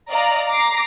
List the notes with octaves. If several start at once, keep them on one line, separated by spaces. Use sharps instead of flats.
D5 D#5 F5 A#5
A#5 D6 A#6 C7